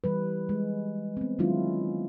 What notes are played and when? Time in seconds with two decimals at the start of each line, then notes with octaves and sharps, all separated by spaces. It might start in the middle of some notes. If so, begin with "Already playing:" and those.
0.04 E3 G3 B4
0.49 G#3
1.17 B3 C4
1.39 D#3 F#3 G#3 C#4 E4 F4